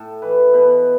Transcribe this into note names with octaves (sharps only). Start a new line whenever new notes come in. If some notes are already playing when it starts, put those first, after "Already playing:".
Already playing: A2 A4
E3 B4
B2 B4